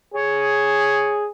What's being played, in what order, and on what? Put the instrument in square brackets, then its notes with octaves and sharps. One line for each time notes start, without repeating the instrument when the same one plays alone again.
[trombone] G#4 [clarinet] C#5